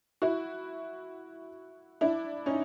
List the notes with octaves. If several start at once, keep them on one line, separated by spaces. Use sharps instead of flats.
E4 F#4
D4 E4
C#4 D#4